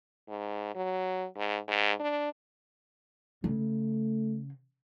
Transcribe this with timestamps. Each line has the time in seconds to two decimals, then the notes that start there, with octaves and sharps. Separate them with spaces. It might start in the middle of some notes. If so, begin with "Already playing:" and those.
0.28 G#2
0.75 F#3
1.37 G#2
1.68 G#2
2.00 D4
3.44 C#3 A3